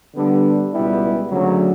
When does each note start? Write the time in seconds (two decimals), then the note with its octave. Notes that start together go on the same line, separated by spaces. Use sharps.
0.15 D3 G3 B3 D4
0.73 C#2 B2 G3 B3 E4
1.30 D2 C#3 F#3